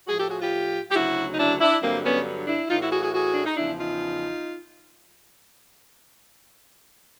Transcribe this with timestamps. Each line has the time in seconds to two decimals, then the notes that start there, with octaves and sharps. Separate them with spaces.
0.07 A2 F3 F#4 G#4
0.18 G4 A4
0.30 F#4 G#4
0.40 F4 G4
0.91 G4
0.95 D2 C#3 F#3 E4 F#4
1.34 D#4
1.38 D4 E4
1.61 D4 E4
1.82 G2 D3 F#3 A#3 C4
2.04 B3 C#4
2.47 D4 E4
2.70 A2 E3 D#4 F4
2.80 E4 F#4
2.92 F#4 G#4
3.02 F#4 G#4
3.13 F#4 G#4
3.34 D4
3.46 D#4
3.56 E2 C#3 F3 D4 E4
3.79 D#4 F4